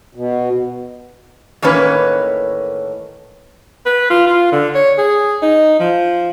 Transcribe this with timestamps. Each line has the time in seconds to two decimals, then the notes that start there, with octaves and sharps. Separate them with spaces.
0.15 B2
1.62 A2 D#3 E3 A#3 C#4 B4
3.86 B4
4.10 F4
4.27 F4
4.52 D3
4.75 C#5
4.98 G#4
5.43 D#4
5.80 F3